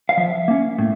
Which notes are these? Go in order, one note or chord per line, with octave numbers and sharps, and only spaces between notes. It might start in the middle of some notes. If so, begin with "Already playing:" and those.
F5
F3 E5
A#3 C#4
A2